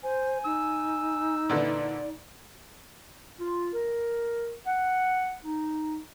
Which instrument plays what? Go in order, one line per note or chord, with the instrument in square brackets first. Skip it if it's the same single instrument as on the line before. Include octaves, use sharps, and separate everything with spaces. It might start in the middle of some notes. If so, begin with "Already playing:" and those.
[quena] C5 [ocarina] G#5
[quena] D#4 [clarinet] E6
[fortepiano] A#2 D3 E3 [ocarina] D5
[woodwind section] F4
A#4
F#5
D#4